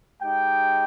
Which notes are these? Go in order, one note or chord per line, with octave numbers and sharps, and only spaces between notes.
G#3 D#4 G4 G5